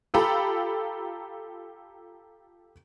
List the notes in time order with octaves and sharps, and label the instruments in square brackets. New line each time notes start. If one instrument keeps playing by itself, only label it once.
[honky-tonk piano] F4 G4 A4 A#5 B5